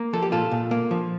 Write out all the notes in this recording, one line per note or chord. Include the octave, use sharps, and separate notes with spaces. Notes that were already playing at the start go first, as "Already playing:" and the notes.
Already playing: A#3
F3 A4
G4
A#2 F4 A4
A#2
A#3
F3